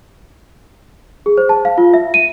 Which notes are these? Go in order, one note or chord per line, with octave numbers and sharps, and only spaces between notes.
G#4
C5
A5
F5
F4
E5
D#7